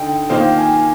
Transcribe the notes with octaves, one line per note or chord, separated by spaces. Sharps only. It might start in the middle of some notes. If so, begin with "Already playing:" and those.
Already playing: D3 D#4 G5
D#3 A#3 F4 C5 F5 G5
G#5